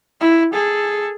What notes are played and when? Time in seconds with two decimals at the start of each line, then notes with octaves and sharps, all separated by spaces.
0.21 E4
0.53 G#4 A4